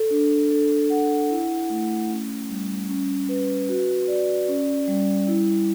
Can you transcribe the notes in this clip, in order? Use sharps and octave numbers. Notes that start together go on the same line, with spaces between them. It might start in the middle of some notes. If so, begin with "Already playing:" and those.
Already playing: A4
D4
A4
F#5
E4
A3
C#4
G3
C#4
B4
F#4
D5
C#4
G3
E4